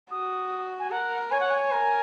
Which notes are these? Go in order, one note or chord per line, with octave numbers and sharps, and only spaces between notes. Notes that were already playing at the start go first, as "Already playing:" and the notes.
F#4 D#6
G#5
A#4 F#5
C#5 G#5
F#5
G#5
A#4